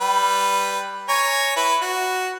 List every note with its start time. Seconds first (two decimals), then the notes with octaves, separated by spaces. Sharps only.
0.01 G3 B4
1.09 C#5 G#5 A#5
1.56 E4 B4
1.82 F#4